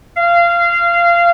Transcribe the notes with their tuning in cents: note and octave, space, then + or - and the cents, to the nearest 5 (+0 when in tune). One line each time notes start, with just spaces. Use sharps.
F5 -20